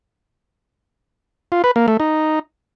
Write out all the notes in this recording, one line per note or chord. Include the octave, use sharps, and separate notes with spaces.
F4
B4
A#3
A3
D#4